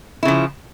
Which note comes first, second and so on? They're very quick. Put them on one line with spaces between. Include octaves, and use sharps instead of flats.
E4 C#3 F3